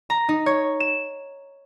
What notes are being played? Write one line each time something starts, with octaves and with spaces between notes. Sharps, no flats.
A#5
D#4
C#5
E7